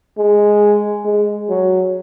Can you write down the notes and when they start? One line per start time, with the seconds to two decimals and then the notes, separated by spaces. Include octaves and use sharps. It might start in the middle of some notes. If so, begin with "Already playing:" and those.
0.18 G#3
1.05 G#3
1.49 F#3